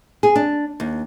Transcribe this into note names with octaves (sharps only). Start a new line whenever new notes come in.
G#4
D4
D#2